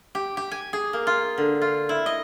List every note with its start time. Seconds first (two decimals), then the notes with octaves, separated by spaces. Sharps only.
0.15 G4
0.37 G4
0.51 G#5
0.73 G#4
0.93 A#3
1.07 F4
1.38 D3
1.61 F4
1.89 E4
2.06 D#5